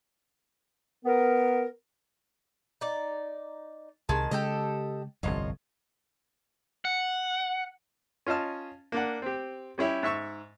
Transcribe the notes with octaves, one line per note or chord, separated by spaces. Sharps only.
B3 A#4
D#4 D5
C2 D#3 G#3 A5
C#3 G#3 G4 A4 D#5
G1 C2 F2 F3 C#5 D#5
F#5
C#4 F4 D#5 A5 F6
A#3 D4 F#5
C4 G4
G3 C#4 E4 G4
G#2 E5 C#6 E6